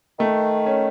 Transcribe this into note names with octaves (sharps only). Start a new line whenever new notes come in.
D#3 A3
C#4